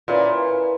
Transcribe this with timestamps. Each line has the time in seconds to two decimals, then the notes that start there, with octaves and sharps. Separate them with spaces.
0.08 A#2 C#4 E4 B4